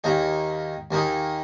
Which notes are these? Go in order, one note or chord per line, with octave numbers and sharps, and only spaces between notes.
D#2 D#3 A#3 D#4 G#4
D#2 D#3 A#3 D#4 G#4